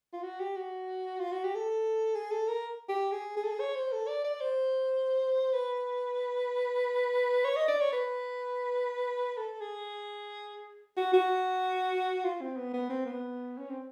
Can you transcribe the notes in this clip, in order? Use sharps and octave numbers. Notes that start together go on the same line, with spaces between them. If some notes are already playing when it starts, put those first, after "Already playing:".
F4
F#4
G4
F#4
F4
F#4
G4
A4
G#4
A4
A#4
G4
G#4
G#4
A4
G#4
C#5
C5
A4
D5
D5
C5
B4
C#5
D#5
D5
C#5
B4
A4
G#4
F#4
F#4
F4
C4
B3
B3
C4
B3
C#4
C4